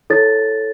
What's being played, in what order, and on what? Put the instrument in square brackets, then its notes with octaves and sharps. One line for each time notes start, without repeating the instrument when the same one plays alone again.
[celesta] E4 A4 C#5 A6